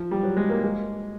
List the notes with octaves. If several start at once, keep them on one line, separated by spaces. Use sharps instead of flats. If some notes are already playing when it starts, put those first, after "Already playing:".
Already playing: F3
G3
F#3
G#3
A#3
G#3